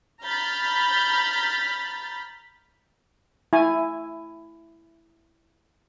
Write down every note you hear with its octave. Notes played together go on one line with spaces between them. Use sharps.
A#5 B5 F6 G6 A6 B6
E4 G#5